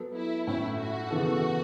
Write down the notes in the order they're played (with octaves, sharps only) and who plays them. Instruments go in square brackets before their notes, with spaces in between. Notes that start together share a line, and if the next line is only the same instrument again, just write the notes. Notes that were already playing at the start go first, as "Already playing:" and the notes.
Already playing: [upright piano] F#3 B3 A4
[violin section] E4
[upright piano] A2 A3 C#4 [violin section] E4
[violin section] F#4
[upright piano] C#3 E3 B3 A4